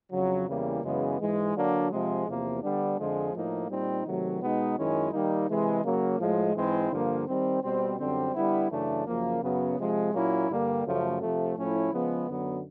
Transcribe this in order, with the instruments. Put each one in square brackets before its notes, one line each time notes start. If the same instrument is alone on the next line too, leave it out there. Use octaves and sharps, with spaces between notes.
[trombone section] F2 C#3 F#3
E2 C#3 E3 G3 A#3
F#2 C#3 E3 G#3 B3
G#2 E3 G#3
D3 F#3 A#3 D4
C3 F3 G#3
E2 C3 F3 A#3
D3 G3 B3 D4
F2 D3 F3 G#3
A2 F3 A#3 D#4
A#2 G3 C4 D#4
C3 D#3 F#3 A3
B2 G#3 B3 D#4
F#2 D#3 G#3 C#4 E4
D#3 G3 A#3 D#4
C3 E3 G#3
C#3 F#3 A#3
A2 F3 G#3
G#2 E3 G#3 C4 E4
G2 D3 F3 A#3
D#3 G3 C4
B2 G3 C4
F#2 D3 G3 C4
D3 G3 B3 E4
F#2 C#3 E3 A3 D4
F#2 C#3 F3 A#3
F#2 C#3 F#3 B3
C3 F3 G#3
A#2 F#3 A#3 C#4 E4
G2 D3 G3 A#3
F#2 C#3 F3 A3
C3 F3 A3
A2 F3 A3 C#4 E4
C#3 F3 G#3 B3
F#2 D3 F#3 B3